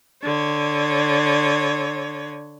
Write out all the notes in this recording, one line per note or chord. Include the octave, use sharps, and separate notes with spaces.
D3 C#5